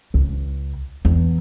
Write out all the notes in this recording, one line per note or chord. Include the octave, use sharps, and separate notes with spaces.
C#2
E2